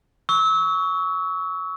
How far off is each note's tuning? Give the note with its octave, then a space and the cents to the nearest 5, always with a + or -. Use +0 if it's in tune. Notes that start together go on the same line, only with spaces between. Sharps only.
C#6 +20 E6 -25